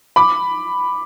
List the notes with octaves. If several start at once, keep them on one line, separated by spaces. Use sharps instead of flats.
B5 D6